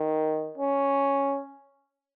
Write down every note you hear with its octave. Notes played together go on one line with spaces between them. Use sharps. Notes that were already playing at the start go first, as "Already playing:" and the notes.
Already playing: D#3
C#4